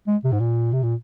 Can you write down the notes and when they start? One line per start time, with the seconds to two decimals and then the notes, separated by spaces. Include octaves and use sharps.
0.07 G#3
0.24 C3
0.32 G#2
0.40 A#2
0.73 C3
0.83 A#2